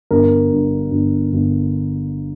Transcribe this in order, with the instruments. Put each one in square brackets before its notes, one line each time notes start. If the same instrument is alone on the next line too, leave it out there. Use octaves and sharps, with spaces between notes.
[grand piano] G1 A#4
G2
G1
G1